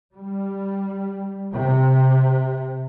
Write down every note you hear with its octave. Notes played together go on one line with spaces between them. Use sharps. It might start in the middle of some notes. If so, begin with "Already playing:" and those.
G3
C3